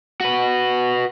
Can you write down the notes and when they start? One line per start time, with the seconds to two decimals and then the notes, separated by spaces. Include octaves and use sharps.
0.20 F#4 B4